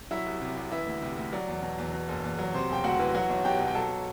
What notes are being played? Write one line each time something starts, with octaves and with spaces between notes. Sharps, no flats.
F#3 E4 E5
C2
C3
C2
E3 E4 E5
D2
C3
D2
F#3 D5
E2
B2
E2
B2
F#1
E2
F#3
C3 C5
E1 G5
D2 F#4 F#5
E3
F#3 F#4 F#5
B1
B2 G4 G5
B1
G5
F#3 A4 A5